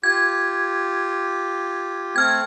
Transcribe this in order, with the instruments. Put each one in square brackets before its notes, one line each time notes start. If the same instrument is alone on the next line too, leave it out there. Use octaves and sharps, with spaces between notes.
[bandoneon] F4 G4 [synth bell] G#6
[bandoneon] A3 C4 [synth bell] F6 G#6